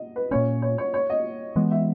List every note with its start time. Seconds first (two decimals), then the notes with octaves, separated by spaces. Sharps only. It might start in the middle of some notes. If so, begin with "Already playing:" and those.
Already playing: D#5
0.16 B4
0.31 A#2 A#3 C#4 C#5
0.62 C#5
0.78 C#5
0.94 C#5
1.10 D#5
1.56 E3 G#3 B3
1.71 E5